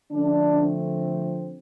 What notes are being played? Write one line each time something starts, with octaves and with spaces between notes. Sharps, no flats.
D3 F3 A3 D4
C4